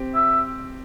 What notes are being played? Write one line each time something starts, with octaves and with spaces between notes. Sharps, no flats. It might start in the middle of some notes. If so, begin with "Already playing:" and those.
Already playing: C4 G4
E5